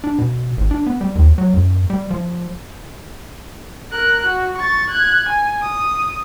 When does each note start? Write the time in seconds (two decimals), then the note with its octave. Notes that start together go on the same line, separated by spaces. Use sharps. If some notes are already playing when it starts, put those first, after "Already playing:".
0.04 D4
0.19 B2
0.57 G#1
0.71 D4
0.87 B3
1.01 G3
1.16 D#2
1.38 F#3
1.54 F#2
1.90 G3
2.10 F3
3.92 A#4 F#6
4.26 F#4
4.57 C#6 A6
4.90 F#6 G#6
5.29 G#5
5.62 D#6